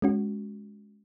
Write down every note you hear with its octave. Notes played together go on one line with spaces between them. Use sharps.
G#3 C#4 F#4